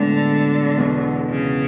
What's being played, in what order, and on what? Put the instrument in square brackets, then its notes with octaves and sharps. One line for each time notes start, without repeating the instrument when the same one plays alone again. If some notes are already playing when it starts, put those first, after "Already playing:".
Already playing: [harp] A2 G#3 B3 F#4 A4 [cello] D3
[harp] E2 B2 F#3
[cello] C#3